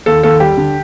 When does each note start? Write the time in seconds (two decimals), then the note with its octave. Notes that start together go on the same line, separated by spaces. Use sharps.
0.06 D#2 A4
0.23 D#2 A4
0.40 G3 G4
0.57 D3